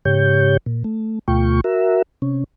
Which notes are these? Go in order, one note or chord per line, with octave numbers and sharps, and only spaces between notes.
G#2 C#3 G4 C#5 G6
A#2
A3
D2 B2 A3 F4 G5 C#6
F#4 A#4 E5
C3 C#4